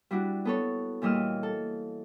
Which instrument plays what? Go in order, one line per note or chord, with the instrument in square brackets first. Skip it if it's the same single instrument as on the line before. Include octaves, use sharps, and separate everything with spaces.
[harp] G3 D4 E4 F#4
B3 A4 C#5
A#2 E3 G3 D#5 E6 F6
A4